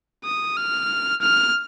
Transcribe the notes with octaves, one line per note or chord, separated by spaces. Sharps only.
D#6
F6
F6